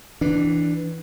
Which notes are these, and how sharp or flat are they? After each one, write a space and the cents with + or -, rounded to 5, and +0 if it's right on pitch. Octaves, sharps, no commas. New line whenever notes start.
E3 +0 D4 +0